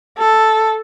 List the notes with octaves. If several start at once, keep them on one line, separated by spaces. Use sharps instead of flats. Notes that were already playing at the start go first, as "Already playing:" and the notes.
A4